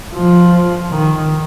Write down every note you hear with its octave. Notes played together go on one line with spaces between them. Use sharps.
F3
D#3